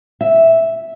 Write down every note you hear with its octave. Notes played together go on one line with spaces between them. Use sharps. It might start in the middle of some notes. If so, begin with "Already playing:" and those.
E5